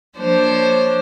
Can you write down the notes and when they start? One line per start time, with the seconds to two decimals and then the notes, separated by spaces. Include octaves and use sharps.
0.16 F3 A#3 D4 C5 C#5